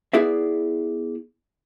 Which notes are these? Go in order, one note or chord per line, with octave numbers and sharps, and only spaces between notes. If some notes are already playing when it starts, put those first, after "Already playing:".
B3 E4 G#4 D5 E5